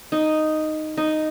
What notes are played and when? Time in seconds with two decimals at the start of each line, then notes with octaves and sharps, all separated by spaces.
0.12 D#4
0.97 D#4